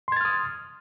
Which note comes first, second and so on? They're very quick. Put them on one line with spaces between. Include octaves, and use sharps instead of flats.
C6 G#6 A6 F6 D#6